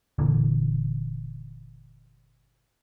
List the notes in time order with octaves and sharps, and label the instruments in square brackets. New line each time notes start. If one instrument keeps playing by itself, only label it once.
[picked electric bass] F#1 A#2 D3 E3